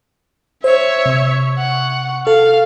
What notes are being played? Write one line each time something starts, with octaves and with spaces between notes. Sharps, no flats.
C5 C#5 E5
C3 C#6
F#5
A4 F5